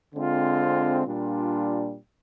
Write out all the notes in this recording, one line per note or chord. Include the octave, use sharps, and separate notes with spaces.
D3 G#3 C4 F4
A#2 G3 D4 F4